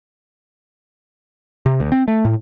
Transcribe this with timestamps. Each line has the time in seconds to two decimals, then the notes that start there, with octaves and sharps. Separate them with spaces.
1.66 C3
1.80 D2
1.92 C4
2.08 A3
2.25 A2